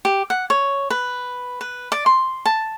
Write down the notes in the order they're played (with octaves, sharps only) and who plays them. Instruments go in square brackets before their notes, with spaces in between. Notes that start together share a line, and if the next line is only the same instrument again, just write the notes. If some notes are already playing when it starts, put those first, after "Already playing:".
[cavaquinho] G4
F#5
C#5
B4
B4
D5
C6
A5